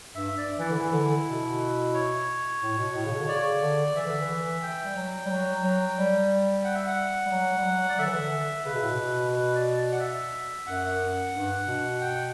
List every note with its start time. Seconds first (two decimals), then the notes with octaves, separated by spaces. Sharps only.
0.15 G2 E5
0.37 D5
0.59 E3 E4
0.71 D3
0.80 E3
0.93 D3
1.28 B2
1.94 C#5
2.62 A2
2.78 B2
2.95 A2
3.06 C#3
3.11 B2
3.20 D3
3.28 C#3 D5
3.61 D3
3.96 E3 E5
4.08 D3
4.21 E3
4.63 G5
4.84 G3
4.96 F#3
5.26 G3
5.30 F#3
5.63 F#3
5.97 G3
6.64 F#5
6.75 E5
6.87 F#5
7.26 G3
7.31 F#3
7.57 G3
7.65 F#3
7.89 D5
7.98 D3 E5
8.07 E3
8.15 D3
8.65 C#3 B4
8.74 B2
8.82 A2
8.90 B2
9.33 B4
9.55 D5
9.77 D5
9.92 F#5
10.00 E5
10.67 F#2 F#5
11.34 G2
11.67 B2
12.01 G5